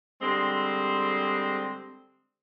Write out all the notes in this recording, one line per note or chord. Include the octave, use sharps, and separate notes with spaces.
D3 G3 G#3 C4